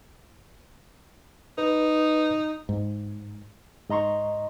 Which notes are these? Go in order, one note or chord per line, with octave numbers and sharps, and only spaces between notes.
D#4 B4
G#2
G#2 D#5 A#5 C6 C#6